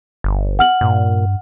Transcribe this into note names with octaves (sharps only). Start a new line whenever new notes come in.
G1
F#5 F6 F#7
G2 A#2